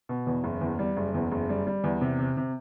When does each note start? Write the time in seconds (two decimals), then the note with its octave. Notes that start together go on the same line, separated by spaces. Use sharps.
0.09 B2
0.27 E2
0.44 F#1
0.61 E2
0.79 G3
0.97 F#1
1.14 E2
1.32 F#1
1.49 G3
1.67 G3
1.84 E2
2.01 C3
2.19 C3
2.37 C3